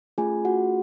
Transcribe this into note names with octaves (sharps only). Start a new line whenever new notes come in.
A3 C#4 F4 G#4 G#5
F#4 F#5